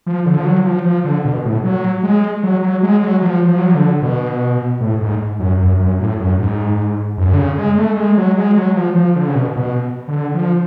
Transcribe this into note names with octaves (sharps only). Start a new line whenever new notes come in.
F3
D3
F3
F#3
F3
F3
D3
B2
A2
F#3
G#3
F#3
F#3
G#3
F#3
F3
F3
F#3
F3
D3
B2
A2
G#2
F#2
F#2
F#2
A2
F#2
G#2
F#2
D3
C#3
G#3
A3
G#3
F#3
G#3
F#3
F3
F3
D3
C#3
B2
B2
D3
F3